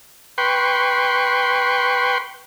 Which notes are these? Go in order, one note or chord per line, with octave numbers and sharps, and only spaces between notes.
B4 G5 C6 C#6